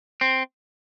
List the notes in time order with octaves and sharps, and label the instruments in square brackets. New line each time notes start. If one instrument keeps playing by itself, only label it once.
[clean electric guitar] C4